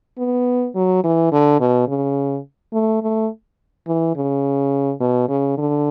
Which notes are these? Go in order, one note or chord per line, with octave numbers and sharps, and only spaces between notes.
B3
F#3
E3
D3
B2
C#3
A3
A3
E3
C#3
B2
C#3
D3